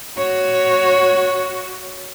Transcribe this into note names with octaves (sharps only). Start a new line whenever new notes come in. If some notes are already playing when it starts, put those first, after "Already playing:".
F#4 C#5